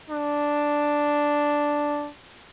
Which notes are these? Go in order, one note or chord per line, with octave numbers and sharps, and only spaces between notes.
D4